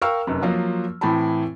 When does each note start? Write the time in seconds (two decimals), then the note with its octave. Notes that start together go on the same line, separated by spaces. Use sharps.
0.02 A#4 F5 G5 C#6 E6 F6
0.27 F1 F#2
0.42 F3 F#3 A#3 F4
1.01 A2 E3 C4 A5 B5